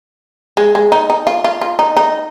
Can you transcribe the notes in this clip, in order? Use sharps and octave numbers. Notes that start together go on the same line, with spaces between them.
G#3
G#3
D#4
D#4
F4
F4
F4
D#4
D#4